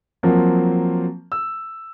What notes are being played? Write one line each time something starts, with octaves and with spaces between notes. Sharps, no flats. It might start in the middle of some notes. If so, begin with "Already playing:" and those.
F3 F#3 A#3 C4
E6